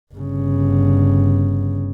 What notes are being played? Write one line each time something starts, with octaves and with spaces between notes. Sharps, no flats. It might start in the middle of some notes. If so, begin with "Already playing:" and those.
G1 C#3